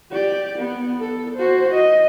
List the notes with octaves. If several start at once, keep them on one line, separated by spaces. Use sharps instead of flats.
G4 D5
B3
A4
F#4 C5
D#5